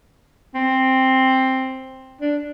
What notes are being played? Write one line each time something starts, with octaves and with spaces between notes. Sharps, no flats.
C4
D4